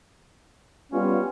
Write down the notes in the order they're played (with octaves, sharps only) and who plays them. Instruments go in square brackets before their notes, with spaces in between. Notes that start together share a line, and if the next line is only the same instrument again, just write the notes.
[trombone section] G3 B3 F4 [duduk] C#4